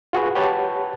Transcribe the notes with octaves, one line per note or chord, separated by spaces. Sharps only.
F4 F#4 G#4 B4
G4 B4 C#5 F#5 A5